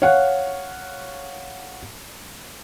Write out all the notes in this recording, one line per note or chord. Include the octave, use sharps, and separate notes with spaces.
C#5 F5 F#5